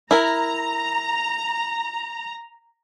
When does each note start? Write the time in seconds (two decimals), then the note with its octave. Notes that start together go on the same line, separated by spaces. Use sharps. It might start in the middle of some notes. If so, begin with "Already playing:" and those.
0.11 E4 A#4 A#5